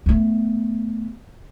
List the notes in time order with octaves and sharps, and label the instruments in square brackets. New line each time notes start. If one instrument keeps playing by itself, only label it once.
[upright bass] A3 B3